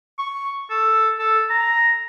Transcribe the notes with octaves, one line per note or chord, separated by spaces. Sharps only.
C#6
A4
A4
A#5